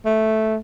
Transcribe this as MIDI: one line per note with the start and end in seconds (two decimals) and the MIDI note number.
0.05 0.57 57